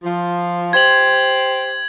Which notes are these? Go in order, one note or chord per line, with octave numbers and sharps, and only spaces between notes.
F3
G4 C5 G#6 F#7